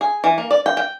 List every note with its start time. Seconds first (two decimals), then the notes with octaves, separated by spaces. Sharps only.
0.01 G#4
0.24 E3
0.38 A#3
0.51 D5
0.66 G5
0.77 G5